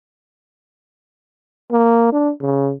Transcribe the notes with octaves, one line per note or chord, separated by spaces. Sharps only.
A#3
D4
C#3